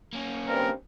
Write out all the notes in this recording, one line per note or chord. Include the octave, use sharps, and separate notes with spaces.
A#3 C#4
G2 C4 A#4